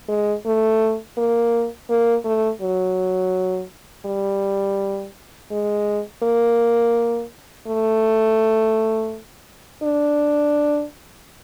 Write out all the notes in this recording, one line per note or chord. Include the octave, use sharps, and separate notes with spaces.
G#3
A3
A#3
A#3
A3
F#3
G3
G#3
A#3
A3
D4